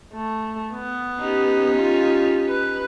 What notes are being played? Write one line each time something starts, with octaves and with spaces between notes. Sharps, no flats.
A3
B3
C#4 D#4 G4
F4
B4